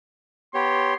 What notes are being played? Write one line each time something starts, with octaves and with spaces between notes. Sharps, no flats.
B3 G4 C#5 C6